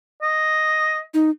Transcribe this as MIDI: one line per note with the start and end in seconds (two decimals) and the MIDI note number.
0.22 1.00 75
1.14 1.30 63